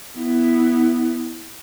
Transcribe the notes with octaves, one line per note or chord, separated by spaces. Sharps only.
B3 E4